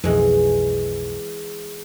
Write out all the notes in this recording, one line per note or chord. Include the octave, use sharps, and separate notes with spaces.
B1 F2 E3 G#3